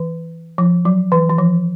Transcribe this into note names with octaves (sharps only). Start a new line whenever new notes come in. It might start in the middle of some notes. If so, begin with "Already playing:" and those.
Already playing: E3
F3
F#3
E3
E3
F3